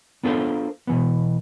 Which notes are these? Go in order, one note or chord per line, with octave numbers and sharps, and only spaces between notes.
B3 D4 F4 A4 A#4 C5
B2 E3 B3